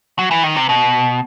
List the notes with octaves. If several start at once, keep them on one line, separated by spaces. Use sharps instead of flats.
F#3
E3
D#3
C3
B2